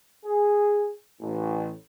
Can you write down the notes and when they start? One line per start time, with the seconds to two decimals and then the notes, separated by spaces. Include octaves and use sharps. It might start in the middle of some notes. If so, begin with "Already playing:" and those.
0.24 G#4
1.20 A1